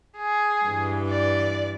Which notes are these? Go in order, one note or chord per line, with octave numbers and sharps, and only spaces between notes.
G#4
G2 E3
D5